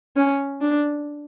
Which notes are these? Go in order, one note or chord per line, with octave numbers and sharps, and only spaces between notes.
C#4
D4